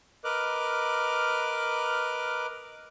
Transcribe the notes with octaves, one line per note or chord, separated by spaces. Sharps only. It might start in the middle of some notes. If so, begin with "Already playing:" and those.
A#4 B4 D#5 D6 F6 F#6